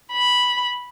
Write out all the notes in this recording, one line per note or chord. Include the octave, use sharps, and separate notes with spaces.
B5